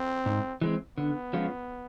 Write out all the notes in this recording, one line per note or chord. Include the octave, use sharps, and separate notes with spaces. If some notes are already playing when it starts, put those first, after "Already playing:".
Already playing: C4
G#2
E3 G#3 C4
D3 B3
F3 G#3 C#4 F4